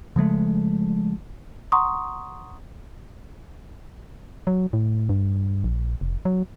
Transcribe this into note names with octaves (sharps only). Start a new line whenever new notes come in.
C#3 F3 G#3 A3
F#5 A#5 C6 C#6 D#6
F#3
A2
G2
A#1
F1
F#3